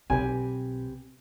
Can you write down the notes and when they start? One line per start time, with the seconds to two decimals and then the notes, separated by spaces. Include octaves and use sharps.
0.10 B1 C4 G4 B4 G#5